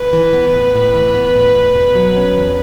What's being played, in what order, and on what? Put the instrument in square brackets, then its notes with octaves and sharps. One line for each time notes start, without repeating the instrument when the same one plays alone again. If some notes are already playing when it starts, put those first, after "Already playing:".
Already playing: [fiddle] B4
[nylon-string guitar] E3
B3
A2
A2
E3
B3
A2
E2
B2
F#3
C#4
E2